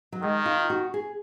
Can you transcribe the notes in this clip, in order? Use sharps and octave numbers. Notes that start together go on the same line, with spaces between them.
F#3
D#3 G#3
F4
F#4
G#4